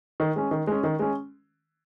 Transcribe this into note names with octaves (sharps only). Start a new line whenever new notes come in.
D#3
G#3 C#4
D#3
G#3 C#4
D#3
G#3 C#4